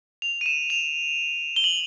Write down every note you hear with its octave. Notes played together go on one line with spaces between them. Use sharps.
F7
D#7
E7
F7
G7
F#7